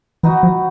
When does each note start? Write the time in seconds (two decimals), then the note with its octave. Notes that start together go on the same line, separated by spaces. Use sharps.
0.23 E3 B3 D#4 F#4
0.43 F3